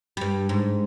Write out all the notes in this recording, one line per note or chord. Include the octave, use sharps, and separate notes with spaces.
G2 G3
G#2